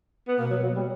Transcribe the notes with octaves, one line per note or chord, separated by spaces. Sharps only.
B3
B2 A#3
F#3
F#3
G3